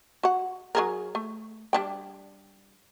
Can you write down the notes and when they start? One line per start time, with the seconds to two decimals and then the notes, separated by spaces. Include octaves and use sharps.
0.23 F#4 F#5
0.75 F#3 G#4 A#4
1.15 A3
1.73 G3 D4 G5